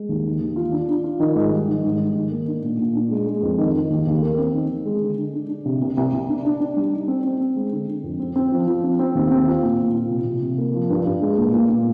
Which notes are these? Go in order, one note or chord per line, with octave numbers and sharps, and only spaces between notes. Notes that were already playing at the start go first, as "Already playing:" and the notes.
Already playing: G#3
D#2
D#3
D#2
F4
D4
D4
F4
D#3
G#2
G3
D#3
G#2
G#2
D#3
A#3
D4
A#2
A#2
D4
G#3
G#3
F2
D#3
D#3
D#2
D#2
A#3
C4
D#3
D#3
G#3
D3
D3
D4
D4
C3
C2
C2
C2
D4
D4
D4
G3
D#4
C4
C4
C4
G#3
D3
D3
F2
C4
C4
F3
F3
C4
C4
D#2
C4
F4
A#2
A#2
F4
C3
C3
C3
A#3
F3
G2
G2
G#3
A#2
A#2
A#2